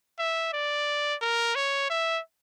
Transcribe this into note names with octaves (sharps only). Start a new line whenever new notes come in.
E5
D5
A#4
C#5
E5